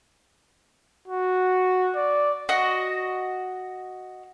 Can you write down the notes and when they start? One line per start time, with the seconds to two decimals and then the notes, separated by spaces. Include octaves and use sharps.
1.08 F#4
1.96 D5
2.49 F#4 D#5